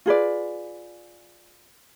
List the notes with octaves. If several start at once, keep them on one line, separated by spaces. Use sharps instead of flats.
F4 G#4 B4 D5